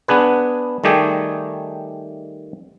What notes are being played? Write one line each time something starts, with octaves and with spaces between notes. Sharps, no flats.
B3 D4 G#4 B4
D#3 G3 A3 G4 G#4